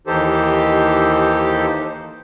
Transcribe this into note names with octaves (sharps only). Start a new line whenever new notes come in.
D#2 E3 D#4 G4 A4 C5